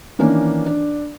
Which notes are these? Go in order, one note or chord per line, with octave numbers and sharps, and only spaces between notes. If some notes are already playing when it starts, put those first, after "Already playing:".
D#3 E3 A#3 C#4 D4
D4